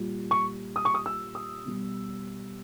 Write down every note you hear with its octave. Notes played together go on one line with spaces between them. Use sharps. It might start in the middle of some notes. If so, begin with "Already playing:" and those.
Already playing: A#2 G3
C#6
D#6
C#6
D#6
E6
D#6
B2 G3